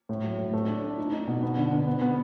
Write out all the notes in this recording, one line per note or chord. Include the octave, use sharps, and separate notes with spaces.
A2
F#3
A2
A3
D4
D4
D#4
D#4
B2
B3
D3
D3
B3
B3